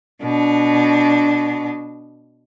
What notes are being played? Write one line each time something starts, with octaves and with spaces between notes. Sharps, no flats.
B2 D4